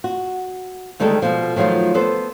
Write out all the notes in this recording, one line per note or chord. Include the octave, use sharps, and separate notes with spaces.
F#4
D2 D#3 G3 G#3 A4
B2 F3
D#3 F3 F#3 A3 F4
B3 A4 B4 C5